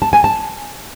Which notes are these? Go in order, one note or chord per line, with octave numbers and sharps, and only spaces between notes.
A5
G#5
A5